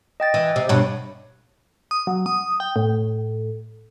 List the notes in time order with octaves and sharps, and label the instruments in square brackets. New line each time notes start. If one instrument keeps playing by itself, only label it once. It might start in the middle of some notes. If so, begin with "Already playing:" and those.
[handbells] D#5 G5 A6
[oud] E3
C3
[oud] G2 B2 [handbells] C#5
[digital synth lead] D#6
F#3
D#6
G5
A2